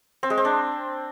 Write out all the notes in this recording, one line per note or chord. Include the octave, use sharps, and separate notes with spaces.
C4
G#3
C4
D4